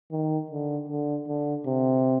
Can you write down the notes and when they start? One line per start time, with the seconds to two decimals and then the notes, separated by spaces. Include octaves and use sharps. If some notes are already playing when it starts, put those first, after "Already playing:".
0.11 D#3
0.51 D3
0.89 D3
1.28 D3
1.66 C3